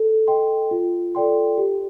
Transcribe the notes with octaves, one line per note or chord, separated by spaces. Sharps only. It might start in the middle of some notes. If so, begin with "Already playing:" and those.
Already playing: A4
D#5 G5 C6
F4
A4 D5 G5 C6
G4